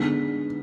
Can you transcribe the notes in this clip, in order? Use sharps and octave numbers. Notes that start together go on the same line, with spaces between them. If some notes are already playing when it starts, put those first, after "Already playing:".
Already playing: D3 G#3 B3 D#4 B6